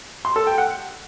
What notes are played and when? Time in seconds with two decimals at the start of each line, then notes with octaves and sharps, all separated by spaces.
0.25 C6
0.36 A4
0.47 G5
0.58 F#5